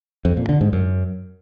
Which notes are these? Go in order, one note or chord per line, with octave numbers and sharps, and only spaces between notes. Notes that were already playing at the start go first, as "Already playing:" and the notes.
F2
A#2
D3
G#2
F#2